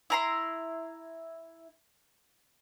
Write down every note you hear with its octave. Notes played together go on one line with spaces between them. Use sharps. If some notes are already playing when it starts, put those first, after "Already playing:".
E4 A#5 C6